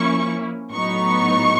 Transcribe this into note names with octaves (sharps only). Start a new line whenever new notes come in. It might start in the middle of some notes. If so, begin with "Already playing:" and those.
Already playing: F3 A#3 C#4 E4 C#6
A2 F#3 B3 D#4 C#6